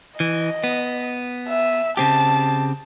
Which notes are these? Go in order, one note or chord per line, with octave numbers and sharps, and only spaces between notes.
E3 D#5
B3
E5
C#3 C4 G4 A5